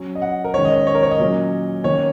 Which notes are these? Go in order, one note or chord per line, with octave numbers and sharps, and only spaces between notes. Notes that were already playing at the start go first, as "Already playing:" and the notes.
Already playing: F#3 C#4
D#5
F#5
A#4
D#3 G#3 C#4 C#5
D#5
D#5
C#5
A#4
C#5
D#5
A#2 F#3 C#4
D#3 A#3 C#4 C#5